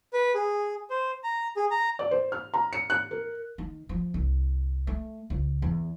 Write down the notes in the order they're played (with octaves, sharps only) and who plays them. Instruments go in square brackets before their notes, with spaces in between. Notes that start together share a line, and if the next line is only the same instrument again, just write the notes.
[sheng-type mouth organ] B4
G#4
C5
A#5
G#4
A#5
[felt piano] D5
C5
F6
A#5
C#7
F#6
A#4
[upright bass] D#3
F3
C2
A3
C#2
E2